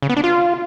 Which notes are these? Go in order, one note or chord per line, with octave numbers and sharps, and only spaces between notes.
C#3
B3
D4
F4